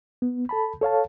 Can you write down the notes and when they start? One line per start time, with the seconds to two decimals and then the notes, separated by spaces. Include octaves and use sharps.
0.22 B3
0.49 A4 A5 B5
0.81 A4 C#5 F5 A5